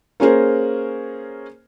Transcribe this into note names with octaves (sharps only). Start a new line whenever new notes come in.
A#3 C#4 G#4 A#4 C5